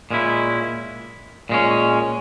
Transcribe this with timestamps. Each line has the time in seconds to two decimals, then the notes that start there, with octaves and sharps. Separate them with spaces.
0.11 A#2 G#3 C#4 E4
1.49 A#2 G#3 C#4